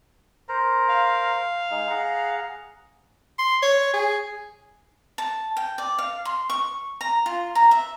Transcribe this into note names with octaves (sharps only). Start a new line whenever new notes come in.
A#4 C5 A#5
F5
G#3 D#4 G#4
G#4 F#5 A#5
C6
C#5
G#4
A5
G5
D5
F5
C6
C#6
A#5
F4
A#5
E5